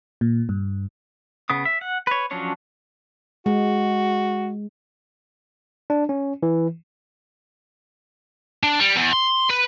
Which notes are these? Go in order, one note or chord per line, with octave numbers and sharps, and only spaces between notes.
A#2
G2
C#3 B3 D#6
E5
F#5
B4 C#5
F3 F#3 C#4 D4 C#5
G#3 F#4
D4
C#4
E3
D4
G3
E2
C6
B4